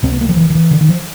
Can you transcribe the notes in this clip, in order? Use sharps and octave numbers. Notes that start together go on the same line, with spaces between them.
C#2 C3 C4
B3
A#3
F3
E3
D#3
E3
D3
D#3
F3